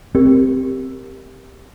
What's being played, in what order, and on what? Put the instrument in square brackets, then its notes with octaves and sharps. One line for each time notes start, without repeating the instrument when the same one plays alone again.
[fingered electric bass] C4 [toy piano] G4 A#4